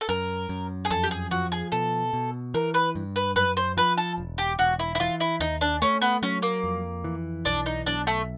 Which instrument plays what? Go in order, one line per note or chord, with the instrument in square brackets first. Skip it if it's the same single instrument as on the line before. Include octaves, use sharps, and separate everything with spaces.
[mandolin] A4
[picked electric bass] F#2 [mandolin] A#4
[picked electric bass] F#2
[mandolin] G#4
[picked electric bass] F2 [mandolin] A4
[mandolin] G4
G#4
[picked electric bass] F3 [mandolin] F#4
[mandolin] G#4
[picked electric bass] B2 [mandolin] A4
[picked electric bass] B2
[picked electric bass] E3 [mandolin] A#4
[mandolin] B4
[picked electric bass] G2
[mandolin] B4
[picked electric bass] F#2 [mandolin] B4
[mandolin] C5
[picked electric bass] F3 [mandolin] B4
[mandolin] A4
[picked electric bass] E1
[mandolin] G4
[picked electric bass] E1 [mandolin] F#4
[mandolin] E4
E4
[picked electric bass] E3 [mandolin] F4
[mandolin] E4
[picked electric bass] D#2 [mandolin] D#4
[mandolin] D4
[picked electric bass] A3 [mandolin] C#4
[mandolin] B3
[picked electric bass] F#3 [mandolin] C#4
[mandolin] A#3
[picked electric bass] F2
E3
[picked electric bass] B1 [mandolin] D4
[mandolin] D#4
[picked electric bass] B1 [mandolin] D4
[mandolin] A3